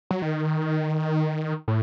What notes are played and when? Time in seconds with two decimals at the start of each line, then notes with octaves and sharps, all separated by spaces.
0.11 F#3
0.22 D#3
1.68 A2